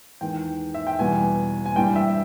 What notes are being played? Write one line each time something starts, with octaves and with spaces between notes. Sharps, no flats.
E2 D#3 G#3 G5
E5
G5
E2 B2 G3 G#5
G#5
G2 E3 G3 G5
G5
E5